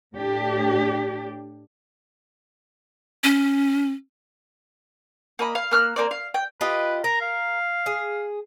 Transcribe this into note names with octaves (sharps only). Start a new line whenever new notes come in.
A2 D4 G4
C#4
A#3 D#5 B5
F5
A#3 F6 F#6
A#3 C4 D5
F5
G5
F4 G4 B4 D#5
A#4 A#5
F5
G#4